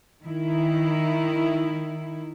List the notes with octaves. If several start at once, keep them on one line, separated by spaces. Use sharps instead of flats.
D#3 E4